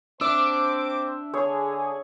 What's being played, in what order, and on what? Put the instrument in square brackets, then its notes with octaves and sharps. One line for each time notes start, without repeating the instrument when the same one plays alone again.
[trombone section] C4 C5 [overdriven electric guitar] D4 [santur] E5 [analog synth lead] D6
[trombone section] D3 [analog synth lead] G#4 [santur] C#5